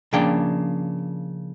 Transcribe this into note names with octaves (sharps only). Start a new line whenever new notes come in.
C#3 F3 A#3 D4 G5